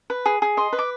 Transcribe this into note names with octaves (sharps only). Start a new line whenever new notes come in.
B4
G#4
G#4
D#5 C6
B4
D6